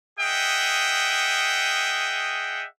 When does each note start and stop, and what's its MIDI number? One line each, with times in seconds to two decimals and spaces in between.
0.19 2.66 68
0.19 2.66 75
0.19 2.66 76
0.19 2.66 78
0.19 2.66 79